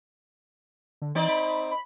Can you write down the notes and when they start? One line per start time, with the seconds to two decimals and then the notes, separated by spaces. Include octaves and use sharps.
1.02 D3
1.15 E3 C4 D#4 D5
1.28 B5
1.71 B5